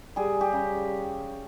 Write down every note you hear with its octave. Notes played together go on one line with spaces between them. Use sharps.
G3 G#4
G4
C#3